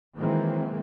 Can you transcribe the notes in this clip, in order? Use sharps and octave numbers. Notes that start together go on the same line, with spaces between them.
D#3 E3 F#3 G#3 A#3 C4